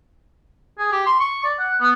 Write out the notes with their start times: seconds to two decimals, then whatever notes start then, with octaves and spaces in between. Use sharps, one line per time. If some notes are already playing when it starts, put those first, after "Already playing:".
0.78 G#4
0.92 G4
1.06 C6
1.20 C#6
1.44 D5
1.59 F#5
1.80 B3